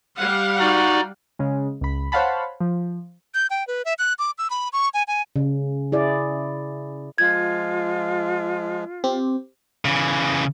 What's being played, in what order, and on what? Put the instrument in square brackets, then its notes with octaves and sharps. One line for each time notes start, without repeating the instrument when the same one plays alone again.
[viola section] G3 F5 F#5
[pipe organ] D#4 D5 [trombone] F#4
[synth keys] C#3 G#3
C#2 B5
C5 C#5 F5 F#5 A5 B5
F3
[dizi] G6
G5
B4
E5
F#6
D6
E6
B5
C#6
G#5
G#5
[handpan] C#3
E4 G#4 D5
[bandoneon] F3 G#3 [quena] F4 [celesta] G#6
[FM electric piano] C4 G4
[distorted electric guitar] C#3 E3